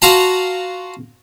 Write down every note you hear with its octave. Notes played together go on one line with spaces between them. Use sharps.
F4 F#4 F5 A5 A#5